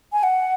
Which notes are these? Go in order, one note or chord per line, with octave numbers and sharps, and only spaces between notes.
G#5
F#5